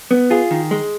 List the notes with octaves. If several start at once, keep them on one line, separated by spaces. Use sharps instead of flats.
B3
F4 G#4
D#3
G#3